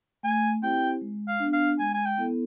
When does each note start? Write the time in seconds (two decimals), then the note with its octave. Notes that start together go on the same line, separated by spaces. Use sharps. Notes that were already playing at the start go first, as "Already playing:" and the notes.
0.23 A3 G#5
0.62 C4 E4 G4 C5 G5
1.01 G#3
1.27 F5
1.40 B3 D4
1.53 F5
1.79 G#3 G#5
1.94 G#5
2.05 G5
2.18 B3 E4 A4